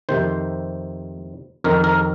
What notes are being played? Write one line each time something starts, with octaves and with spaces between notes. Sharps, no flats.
F2 C3 D#3 C5
F2 D#3 A#4
A#4